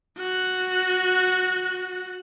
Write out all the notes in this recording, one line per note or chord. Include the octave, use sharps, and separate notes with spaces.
F#4 F#6